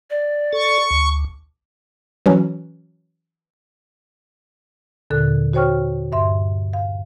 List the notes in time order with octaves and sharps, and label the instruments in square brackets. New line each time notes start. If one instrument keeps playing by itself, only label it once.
[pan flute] D5
[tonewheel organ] A4 [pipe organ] C#6
[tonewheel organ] D2
[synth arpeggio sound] E3 F#3 C#4
[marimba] D#2 A#2 D3 A4 F#6
F#4 C5 C#5 G5 C#6 F6
G2 E5 C6
F5